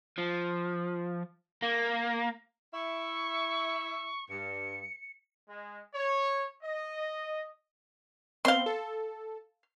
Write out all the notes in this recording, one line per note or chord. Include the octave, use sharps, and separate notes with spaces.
F3
A#3
E4 E5 C#6
G2 C#7
G#3
C#5
D#5
B3 C4 F5 C6
A4